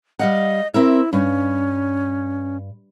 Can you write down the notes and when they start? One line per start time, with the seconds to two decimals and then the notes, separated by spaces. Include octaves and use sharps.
0.19 G3 D#5 F5 F#5
0.74 C4 E4 A#4 E5
1.13 G2 C#4